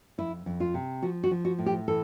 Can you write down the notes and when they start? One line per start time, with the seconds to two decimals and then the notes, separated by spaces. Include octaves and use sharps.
0.18 F2 E4
0.46 F2
0.60 F4
0.74 C3
1.02 F3 F#4
1.24 F#4
1.31 F3
1.45 F#4
1.59 A2
1.66 G4
1.88 E3 A4